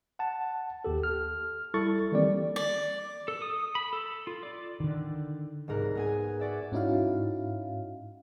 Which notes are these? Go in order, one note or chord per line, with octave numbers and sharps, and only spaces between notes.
F#5 A5
D#2 G4 A4
F6
G3 E4 A4 C#6 A6
D#3 E3 G3 A#3 C4 D5
D5
A4
D#6
B5
A4
F4
D5
D3 D#3
C2 G#2 A#4 F#6
B3 G#4 G#5
F#4 D5 E5
G#2 C#4 D#4 E4 F#4 F5